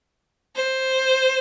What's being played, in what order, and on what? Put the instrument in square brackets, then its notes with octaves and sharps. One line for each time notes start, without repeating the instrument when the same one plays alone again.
[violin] C5